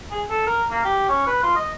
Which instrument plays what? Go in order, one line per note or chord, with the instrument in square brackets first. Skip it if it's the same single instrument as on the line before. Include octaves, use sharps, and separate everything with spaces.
[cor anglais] G#4
A4
A#4
A#3
G4
C#4
B4
F4
D#5